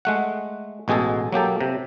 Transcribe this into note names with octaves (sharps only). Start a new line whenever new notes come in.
G#3 A3 F#5
A1 B2 G#3 G#4 A4
F#3 A#3 G4 A4
C3